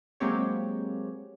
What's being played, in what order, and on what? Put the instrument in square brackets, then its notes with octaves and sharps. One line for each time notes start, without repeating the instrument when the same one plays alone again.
[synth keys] F#3 G#3 A#3 C4 G4 C#5